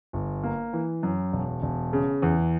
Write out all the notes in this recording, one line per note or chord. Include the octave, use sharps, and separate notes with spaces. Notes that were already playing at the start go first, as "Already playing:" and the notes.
G1
A#3
E3
F#2
E1
E1
C#3
E2